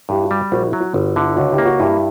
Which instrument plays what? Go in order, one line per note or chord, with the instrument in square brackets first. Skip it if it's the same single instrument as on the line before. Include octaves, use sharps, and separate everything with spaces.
[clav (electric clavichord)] G2 [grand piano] E4 G4
[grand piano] F#4
[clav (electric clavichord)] G3
[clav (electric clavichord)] A#1 [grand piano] F#4
[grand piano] E4
[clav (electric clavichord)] F#3
[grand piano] F#4
[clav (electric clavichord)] G1 [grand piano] F#4
[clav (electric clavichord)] D3 [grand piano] E4
[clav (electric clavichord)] C#2 [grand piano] F#4
[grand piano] E4 G4
[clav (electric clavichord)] A#3
[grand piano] F#4
[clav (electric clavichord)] G2 [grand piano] E4 G4